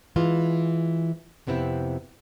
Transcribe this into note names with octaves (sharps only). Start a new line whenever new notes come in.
E3 G#3 F4
F2 C3 B3 C4 E4